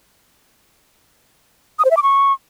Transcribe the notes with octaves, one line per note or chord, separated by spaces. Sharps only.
D#6
C5
E5
D6
C#6